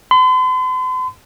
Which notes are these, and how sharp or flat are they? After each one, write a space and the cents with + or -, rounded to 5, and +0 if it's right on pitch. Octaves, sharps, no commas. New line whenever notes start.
C6 -45